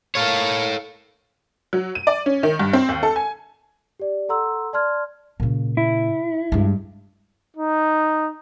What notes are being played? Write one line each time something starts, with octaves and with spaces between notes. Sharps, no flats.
A4 A#4 C#5 F5
F#3
D#7
D5
C#4
D#3
G2
C4
D#2
A4
G#5
G4 D5
A4 F#5 A#5 C6 E6
D5 A5 C6 F6 G#6
A#2 C#3
E4
G2 G#3
D#4